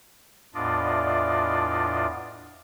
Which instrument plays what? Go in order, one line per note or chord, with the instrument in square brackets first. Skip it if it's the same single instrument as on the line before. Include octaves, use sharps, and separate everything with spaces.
[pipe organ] E2 A2 D4 F4 D5 D#5